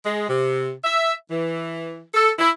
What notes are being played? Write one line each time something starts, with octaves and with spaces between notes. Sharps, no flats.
G#3
C3
E5
E3
A4
E4